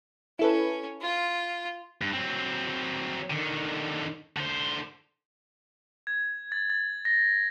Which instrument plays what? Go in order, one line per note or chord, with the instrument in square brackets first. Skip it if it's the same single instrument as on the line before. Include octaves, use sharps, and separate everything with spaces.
[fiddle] C#4 [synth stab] E4 A4 B4
[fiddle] F4
[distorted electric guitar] G2
F#3 C4
D3 D#3
D3 C5
[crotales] G#6
A6
A6
A#6